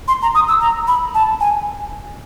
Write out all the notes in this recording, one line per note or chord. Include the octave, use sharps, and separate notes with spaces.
C6
A#5
D#6
E6
A#5
B5
A5
G#5